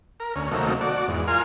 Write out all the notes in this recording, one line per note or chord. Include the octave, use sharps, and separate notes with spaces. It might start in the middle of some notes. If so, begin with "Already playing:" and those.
A#4
D2 C#4
C3 D#3 F#3 A3 A#3
F#4 D5
E2 G#2
F4 A#4 G#5 C6 F6